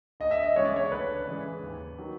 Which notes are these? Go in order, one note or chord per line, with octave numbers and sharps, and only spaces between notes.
D2 D#5
E5
D#5
C#3 E3 G#3 C#5
D5
C#5
D2 B4
C#3 E3 G#3
D#2
D#3 F#3